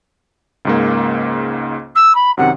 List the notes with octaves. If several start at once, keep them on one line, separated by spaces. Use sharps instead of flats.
C#2 G#2 A#3
E6
B5
F#2 C3 D#3 F#5